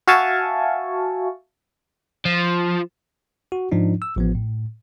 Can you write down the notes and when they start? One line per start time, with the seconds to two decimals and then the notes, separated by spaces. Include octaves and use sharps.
0.08 F#4 E5 F5 G#5 A5 C#6
2.25 F3
3.52 F#4
3.72 G#2 F3 D4 D#4
4.02 E6
4.16 A1 F3 B3
4.35 A2